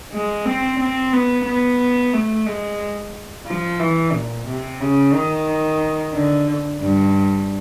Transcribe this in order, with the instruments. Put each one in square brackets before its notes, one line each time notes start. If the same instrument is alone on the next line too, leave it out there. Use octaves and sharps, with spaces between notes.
[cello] G#3
C4
C4
B3
B3
A3
G#3
F3
E3
A#2
C3
C#3
D#3
D3
G2